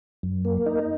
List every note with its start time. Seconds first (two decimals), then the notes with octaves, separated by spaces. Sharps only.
0.23 F#2
0.45 A#3
0.66 D#4